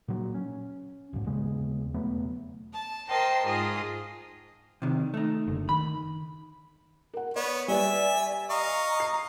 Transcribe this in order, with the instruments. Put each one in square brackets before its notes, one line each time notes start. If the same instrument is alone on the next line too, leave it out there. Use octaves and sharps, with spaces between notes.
[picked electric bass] A#2 F#3
C#4
B1 G#2
D#2 C#3 G#3 B3
E1 F#3 A3 B3
[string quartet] A5
A#4 C5 D#5 G5 A5 C6
G#2 F4 G#4 D#5 D#6
[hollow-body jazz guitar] C3 D#3
A3 D#4
[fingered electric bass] F#1 D3
[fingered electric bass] D#3 [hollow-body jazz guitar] B5
[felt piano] A#4 F#5
[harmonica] B3 C#5 [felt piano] D5
[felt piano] G3 B4 [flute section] D5 G#5 [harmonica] E5
[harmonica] D#5 F5 C#6 [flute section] A#5
[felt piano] C7